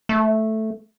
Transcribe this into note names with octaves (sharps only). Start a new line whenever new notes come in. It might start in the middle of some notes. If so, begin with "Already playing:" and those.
A3